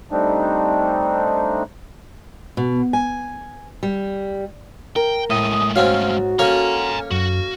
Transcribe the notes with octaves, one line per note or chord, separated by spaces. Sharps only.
G3 A3 C4 D4 D#4
B2
G#5
G3
A#4 G5
A2 G#3 A3 D#6
G#2 C4 C#4 F#4 C#5 F5
A#3 C#4 A4 C#5 G#5 A#5
F#2 F#4